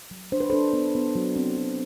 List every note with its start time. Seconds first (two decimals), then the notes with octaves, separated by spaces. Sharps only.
0.11 F#3
0.32 D4 C5
0.40 B4
0.50 D4 A4 C5
0.73 B3
0.95 B3
1.15 F#3
1.36 C4
1.57 F#3